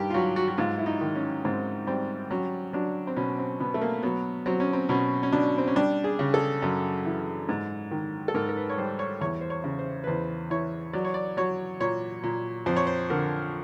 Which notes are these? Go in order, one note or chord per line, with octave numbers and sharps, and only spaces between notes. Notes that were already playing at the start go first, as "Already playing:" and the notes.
Already playing: G2 D#3 G4
F4
F#3 F#4
F#4
F#4
G#2 F4
E4
D#4
D#3
C#4
G#2 C4
G3 C4
F#3 C#4
F#3 D4
C4
B2 C#4
C4
B2 B3
A3
A#3
F#3 B3
F#3 C4
C#4
C4
B2 C#4
C#4
B2 D4
C4
C#4
G3 D4
G#4
C#3
A4
F#2
E3
G#2
D#3
A4
G#2 A#4
A#4
B4
C#5
G3 C5
C#5
E2 C#5
C5
C#5
C#3
C5
B4
E2 C5
E3 C#5
F#3 D5
C#5
D5
F#3 C#5
A#2 C#5
A#2
F2 C5
C#5
C5
D3 A#4